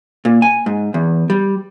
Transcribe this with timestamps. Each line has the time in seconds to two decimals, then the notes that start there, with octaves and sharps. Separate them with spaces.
0.25 A#2
0.42 G#5
0.66 G#2
0.94 E2
1.30 G3